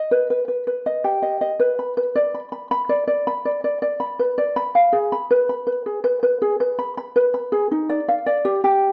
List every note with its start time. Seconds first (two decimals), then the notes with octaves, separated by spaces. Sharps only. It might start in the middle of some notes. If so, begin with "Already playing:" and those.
Already playing: D#5
0.11 B4
0.30 B4
0.48 B4
0.67 B4
0.86 D#5
1.04 G4
1.22 D#5
1.41 D#5
1.60 B4
1.79 B5
1.97 B4
2.16 D5
2.34 B5
2.52 B5
2.71 B5
2.89 D5
3.07 D5
3.27 B5
3.45 D5
3.64 D5
3.82 D5
4.00 B5
4.19 B4
4.38 D5
4.56 B5
4.75 F5
4.93 G#4
5.12 B5
5.31 B4
5.49 B5
5.67 B4
5.86 G#4
6.04 B4
6.23 B4
6.42 G#4
6.60 B4
6.79 B5
6.97 B5
7.16 B4
7.34 B5
7.52 G#4
7.71 D#4
7.89 D5
8.08 F5
8.26 D5
8.45 G4
8.64 G4